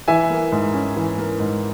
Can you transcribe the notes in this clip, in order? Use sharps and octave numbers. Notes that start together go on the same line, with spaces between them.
E3 E5 G#5
A#3
G#2
C#4
E3
A#3
G#2